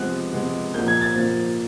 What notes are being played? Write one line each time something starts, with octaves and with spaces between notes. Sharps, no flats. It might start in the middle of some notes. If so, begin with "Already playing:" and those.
Already playing: C3 F3 G#3 B3 F#6
C3 F3 G#3 B3
A#2 F3 A#3 G6
G#6
A6
A#2 F3 A#3